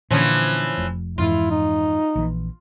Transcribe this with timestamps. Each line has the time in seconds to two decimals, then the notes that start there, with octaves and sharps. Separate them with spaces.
0.11 A#2 D3 E3 F3 C#4
0.77 F1 F2
1.18 F2 G#2 E3 E4 F4
1.51 D#4
2.15 A#1 E3